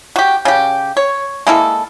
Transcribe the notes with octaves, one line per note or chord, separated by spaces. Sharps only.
F#4 G4
C#3 G4
C#5
G#3 A#3 E4 A4